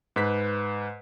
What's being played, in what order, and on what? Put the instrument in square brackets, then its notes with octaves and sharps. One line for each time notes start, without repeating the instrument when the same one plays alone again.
[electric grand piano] G#2 B4 B6